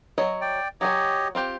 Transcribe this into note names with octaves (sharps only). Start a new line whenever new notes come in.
F#3 C#5 D#5
D5 G5
F#3 F#4 G4 C#5 D#5 G#5
C4 F4 G4